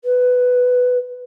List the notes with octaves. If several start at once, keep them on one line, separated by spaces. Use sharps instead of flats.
B4